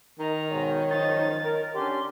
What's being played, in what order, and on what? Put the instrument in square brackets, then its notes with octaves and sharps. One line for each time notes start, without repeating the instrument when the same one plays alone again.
[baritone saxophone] D#3 [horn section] D#4 A#4 [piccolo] A#5
[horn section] G#2 B2 [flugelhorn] C#5
[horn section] F#2 F3 D#4 [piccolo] A6
[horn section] A#4
[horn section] D3 C#4 D4 [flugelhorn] G4 [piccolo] C6